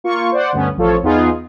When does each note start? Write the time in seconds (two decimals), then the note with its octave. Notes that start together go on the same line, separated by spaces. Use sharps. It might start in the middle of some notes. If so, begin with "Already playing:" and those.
0.04 A#3 F4 C#6
0.32 C5 D5 F#5
0.53 D2 G2 B3 C#4
0.77 A1 F3 F4 A4 C#5
1.03 E2 B3 D#4 F4 G#4